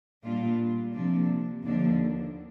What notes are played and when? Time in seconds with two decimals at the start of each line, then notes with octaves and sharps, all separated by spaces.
0.23 A#2 G3 D4 F4
0.94 C3 F3 A#3 D4
1.64 D#2 D3 F3 A#3 D4